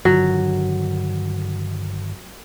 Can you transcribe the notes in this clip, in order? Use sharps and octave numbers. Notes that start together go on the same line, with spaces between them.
G2 D3 D#3 F#3